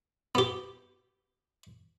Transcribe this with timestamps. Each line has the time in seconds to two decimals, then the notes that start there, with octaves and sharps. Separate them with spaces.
0.35 B3 G4